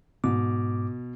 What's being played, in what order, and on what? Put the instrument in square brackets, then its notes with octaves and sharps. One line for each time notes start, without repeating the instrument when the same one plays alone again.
[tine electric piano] G#2 D6 [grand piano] B2